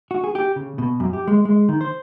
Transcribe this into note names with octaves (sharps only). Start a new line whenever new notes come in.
F#4
G#4
G4
C#3
B2
F#2
G4
G#3
G#3
D#3
C5